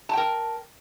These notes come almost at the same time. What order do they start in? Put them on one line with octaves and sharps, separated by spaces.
A5 G5 A#4